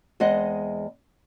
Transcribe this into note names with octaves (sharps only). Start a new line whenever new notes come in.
E2 G#3 C4 D#5 F#5